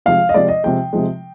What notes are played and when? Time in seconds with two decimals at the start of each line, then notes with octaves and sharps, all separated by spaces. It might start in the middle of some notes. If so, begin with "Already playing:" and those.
0.06 C3 F3 G#3 F5
0.29 D#5
0.34 C3 F3 G#3 D5
0.49 D#5
0.64 C3 F3 G#3 G5
0.93 C3 F3 G#3